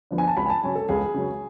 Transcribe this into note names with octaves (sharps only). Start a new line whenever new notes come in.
D3 F3 B3 D4
G#5
A5
C#2 B5
G#5
A5
C#3 F#3 C#4 G#5
A4
C#2 G#4
C#3 F#3 C#4